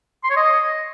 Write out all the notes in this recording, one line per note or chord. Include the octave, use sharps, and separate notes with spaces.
C6
C#5
D#5